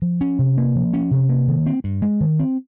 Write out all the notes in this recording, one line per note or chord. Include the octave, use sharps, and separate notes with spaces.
F3
C#4
C3
A#3
F3
C#4
C3
A#3
D#3
C4
G2
G#3
D#3
C4